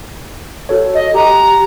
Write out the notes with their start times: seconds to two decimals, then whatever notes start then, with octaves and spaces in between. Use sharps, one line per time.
0.69 F#4 A4 C#5
0.95 D#5
1.15 G4 A#5